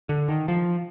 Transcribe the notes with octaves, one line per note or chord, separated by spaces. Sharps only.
D3
D#3
F3